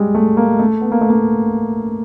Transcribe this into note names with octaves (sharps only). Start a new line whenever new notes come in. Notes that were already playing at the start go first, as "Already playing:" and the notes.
Already playing: G3 G#3
A3
A#3
A3
B3
A#3
A3
A#3